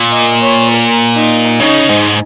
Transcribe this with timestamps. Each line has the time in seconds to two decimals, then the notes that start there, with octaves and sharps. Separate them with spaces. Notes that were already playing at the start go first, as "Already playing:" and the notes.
Already playing: A#2
0.12 D#5
0.41 C#5
0.71 A#4
1.15 D#4
1.60 C#3 D#4
1.90 G#2